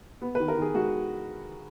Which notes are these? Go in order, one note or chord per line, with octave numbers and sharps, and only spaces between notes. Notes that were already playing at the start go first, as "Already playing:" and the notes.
B3
D#3 B4
A#4
D#3
G#4
G#3 F#4